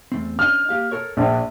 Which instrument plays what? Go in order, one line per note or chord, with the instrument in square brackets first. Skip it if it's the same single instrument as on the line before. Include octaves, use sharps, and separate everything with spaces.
[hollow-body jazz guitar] E2 A3 C4
[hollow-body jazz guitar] C#4 D4 D#5 [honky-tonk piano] F6
[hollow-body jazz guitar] A#3 G4 F5
A4 A#4 C#5
[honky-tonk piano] A#1 D4